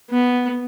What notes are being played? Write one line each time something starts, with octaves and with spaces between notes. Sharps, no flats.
B3